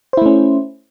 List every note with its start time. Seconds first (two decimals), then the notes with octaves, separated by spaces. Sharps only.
0.13 C5
0.17 E4
0.22 A3
0.26 C#4